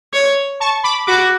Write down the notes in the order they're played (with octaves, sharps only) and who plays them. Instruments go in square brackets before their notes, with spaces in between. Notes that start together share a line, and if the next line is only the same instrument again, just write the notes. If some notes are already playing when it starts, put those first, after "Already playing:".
[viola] C#5
[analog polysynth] A5 C#6
B5 D6
[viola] F#4 [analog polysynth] B5 D6